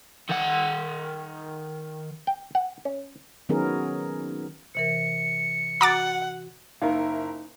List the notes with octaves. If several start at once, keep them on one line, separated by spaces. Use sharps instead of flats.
D#3 F#5
G5
F#5
C#4
D#3 F#3 B3 C#4 G#4 A#4
C3 E3 A#4 C#7
F#4 F#5 A#5 D6 A6
F#1 D#4 E4 A#4 F5